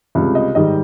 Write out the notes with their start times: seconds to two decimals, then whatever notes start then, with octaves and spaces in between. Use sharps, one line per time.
0.15 C#2 C3 G3
0.35 D#5
0.55 G#2 D#3 G3 D#5